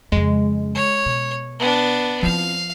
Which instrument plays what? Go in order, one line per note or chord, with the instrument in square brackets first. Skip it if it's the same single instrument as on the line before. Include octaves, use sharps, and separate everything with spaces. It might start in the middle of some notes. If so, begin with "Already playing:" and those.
[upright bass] F2 C#3 [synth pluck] G#3
[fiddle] C#5
[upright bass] B2
[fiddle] B3 D4
[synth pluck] F3 [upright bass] C4 E4 [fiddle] F5